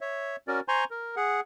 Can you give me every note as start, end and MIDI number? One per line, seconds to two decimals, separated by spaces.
0.01 0.36 73
0.01 0.36 76
0.48 0.60 61
0.48 0.60 66
0.48 0.60 70
0.48 0.60 74
0.68 0.84 72
0.68 0.84 80
0.68 0.84 82
0.68 0.84 84
0.68 0.84 85
0.91 1.15 70
1.16 1.40 68
1.16 1.40 78